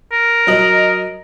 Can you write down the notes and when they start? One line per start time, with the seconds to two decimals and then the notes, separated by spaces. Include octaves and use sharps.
0.12 A#4
0.47 F#3 D#5 F#7